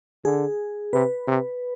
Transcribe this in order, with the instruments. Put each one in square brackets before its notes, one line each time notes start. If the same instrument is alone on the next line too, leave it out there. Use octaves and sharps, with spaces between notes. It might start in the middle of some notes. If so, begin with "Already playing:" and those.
[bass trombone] D3 [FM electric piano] G#4
[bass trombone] C3 [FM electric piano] B4
[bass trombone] C3